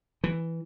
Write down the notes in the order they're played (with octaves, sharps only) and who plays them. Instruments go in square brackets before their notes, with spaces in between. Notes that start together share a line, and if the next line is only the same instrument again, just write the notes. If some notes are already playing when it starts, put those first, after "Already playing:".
[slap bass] E3